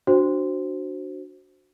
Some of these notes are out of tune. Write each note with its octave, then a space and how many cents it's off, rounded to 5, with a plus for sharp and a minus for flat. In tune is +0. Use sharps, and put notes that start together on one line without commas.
D4 +5 F#4 +0 C5 +0